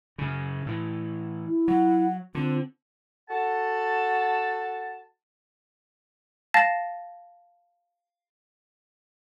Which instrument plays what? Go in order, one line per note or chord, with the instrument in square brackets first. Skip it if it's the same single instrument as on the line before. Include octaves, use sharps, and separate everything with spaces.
[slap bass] F#2 C#3
A2 E3
[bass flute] E4
[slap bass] F#3 [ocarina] F#5
[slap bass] D3 [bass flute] C4 [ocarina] F4
[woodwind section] F#4 A4 F#5 A5
[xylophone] F5 A5 A6 A#6